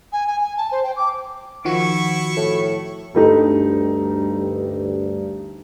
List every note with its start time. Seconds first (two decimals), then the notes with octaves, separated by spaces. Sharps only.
0.13 G#5
0.27 G#5
0.41 G#5
0.57 A5
0.72 C5
0.83 G5
0.96 D6
1.65 D#3 F3 E4 F#4 C#6
2.37 A2
3.15 D2 G2 G3 A3 D#4